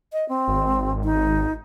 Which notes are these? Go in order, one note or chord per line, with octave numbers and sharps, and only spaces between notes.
D#5
C4
G#1
D#4